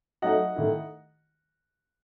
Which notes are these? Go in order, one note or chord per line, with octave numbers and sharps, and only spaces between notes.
F#3 A3 D#4 D#5 F#5
D#3 A3 E4